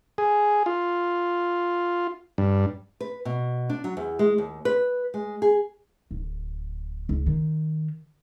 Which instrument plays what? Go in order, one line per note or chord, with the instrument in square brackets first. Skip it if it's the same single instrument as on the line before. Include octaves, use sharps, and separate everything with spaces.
[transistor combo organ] G#4
F4
G2
[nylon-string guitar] B4
B2
D4
F#3
E2
G#3
D#2
B4
G#3
G#4
[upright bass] D1
C#2
D#3